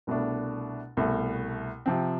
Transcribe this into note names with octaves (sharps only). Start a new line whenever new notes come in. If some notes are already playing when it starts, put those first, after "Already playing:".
C2 B2 A3 D4
C2 B2 A3
C3 F3 C4